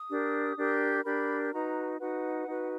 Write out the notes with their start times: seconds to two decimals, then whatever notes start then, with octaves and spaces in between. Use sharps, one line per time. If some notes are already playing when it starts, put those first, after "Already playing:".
Already playing: D#6
0.09 D4 G4 A#4
0.56 D4 G4 A#4
1.04 D4 G4 A#4 B5
1.52 D#4 F#4 B4 A#5
2.00 D#4 F#4 B4 F#5
2.47 D#4 F#4 B4